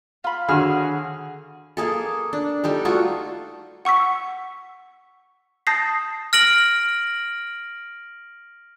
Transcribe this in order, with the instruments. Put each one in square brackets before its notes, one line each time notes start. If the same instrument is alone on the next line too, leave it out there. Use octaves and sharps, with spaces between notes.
[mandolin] F4 B5
[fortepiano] D3 F#4 G#4 [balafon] D#3 F#5 B5 [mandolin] F6
[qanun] A#3 G#4 A4
D4
G3 D#4 A4
A3 F4 F#4
[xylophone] F#5 C#6 E6 B6
A5 D#6 G6 A6 A#6 C7
[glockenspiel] F6 A#6 D7 F#7